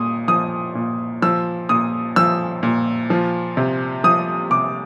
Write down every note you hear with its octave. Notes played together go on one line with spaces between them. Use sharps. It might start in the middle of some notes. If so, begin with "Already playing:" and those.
Already playing: A#2 D#6
F3 D#6
A#2
F3 E6
A#2 D#6
F3 E6
A#2
F3
C3
F3 D#6
C3 D6